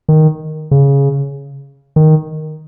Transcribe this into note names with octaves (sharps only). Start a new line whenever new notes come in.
D#3
C#3
D#3